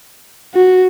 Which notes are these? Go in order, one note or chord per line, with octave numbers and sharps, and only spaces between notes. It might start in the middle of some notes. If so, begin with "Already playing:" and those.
F#4